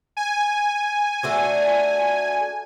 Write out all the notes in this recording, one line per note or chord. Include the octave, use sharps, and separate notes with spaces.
G#5
A3 D4 F#4